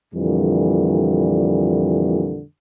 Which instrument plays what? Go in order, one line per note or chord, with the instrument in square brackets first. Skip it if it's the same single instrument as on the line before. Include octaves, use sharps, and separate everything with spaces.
[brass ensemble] F2 A#2 D3 E3 G3